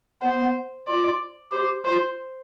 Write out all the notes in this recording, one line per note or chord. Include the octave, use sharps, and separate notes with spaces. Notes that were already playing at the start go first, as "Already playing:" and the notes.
B3 C5
F4 D5
G4 C5
F4 C5